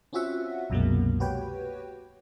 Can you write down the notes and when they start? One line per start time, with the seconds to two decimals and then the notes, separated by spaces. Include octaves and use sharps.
0.13 C4 C#4 F4 F#4 E5 F#5
0.70 C2 F#2 B2 F#3 G#3 A#3
1.20 F#4 G4 B4 C#5 G5